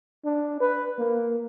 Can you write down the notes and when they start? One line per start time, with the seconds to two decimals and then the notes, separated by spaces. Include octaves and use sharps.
0.25 D4
0.60 B4
0.99 A#3